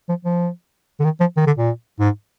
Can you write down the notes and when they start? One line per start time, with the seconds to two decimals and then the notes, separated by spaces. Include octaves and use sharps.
0.09 F3
0.25 F3
1.00 D3
1.04 D#3
1.20 F3
1.37 D#3
1.47 D3
1.57 A#2
1.99 G#2